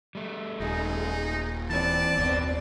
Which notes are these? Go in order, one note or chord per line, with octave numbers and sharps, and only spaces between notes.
G3 A3
D#1 D#4 G#4
E3 C4 D5 A5
F#1 D#2 B2 B3